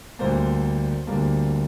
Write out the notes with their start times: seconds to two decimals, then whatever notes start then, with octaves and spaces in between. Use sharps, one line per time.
0.19 D2 D3 G3 A#3 C5
1.07 D2 D3 G3 A#3